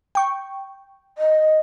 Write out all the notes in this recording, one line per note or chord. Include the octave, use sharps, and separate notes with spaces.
G5 C#6
D#5